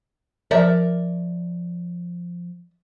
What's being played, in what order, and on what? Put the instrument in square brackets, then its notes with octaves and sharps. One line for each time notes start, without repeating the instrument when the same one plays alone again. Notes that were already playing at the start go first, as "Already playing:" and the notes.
[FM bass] F3 [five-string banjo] A#4 D5 E5